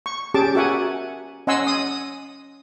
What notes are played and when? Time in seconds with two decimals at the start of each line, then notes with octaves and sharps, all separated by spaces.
0.06 C#6
0.34 C#4 G4 G#4 A5 D6
0.55 F#4 A#4 E5 F#5 G#5
1.47 C#4 D#5 F#5 G#5 C6 E6
1.67 D#6